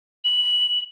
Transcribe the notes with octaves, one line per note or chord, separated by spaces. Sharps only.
F#7